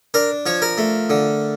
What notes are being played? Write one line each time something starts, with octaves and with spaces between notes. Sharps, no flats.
D4 A#4
F3 C#5
A#4
A3
D3